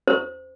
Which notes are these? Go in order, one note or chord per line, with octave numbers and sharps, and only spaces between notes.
C5